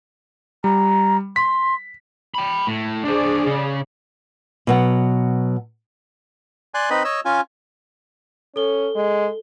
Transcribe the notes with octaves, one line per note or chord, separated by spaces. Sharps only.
G3 A#5
C6 B6
G5 B5
A2
D4 G#4 C5 D5
C#3
B2 F#3 F#5
D5 G#5 C6 F#6
C4 D#4 B4 D#5 B5
C#5 D#5 E6
C#4 F4 G#5
C#4 A4 G7
G#3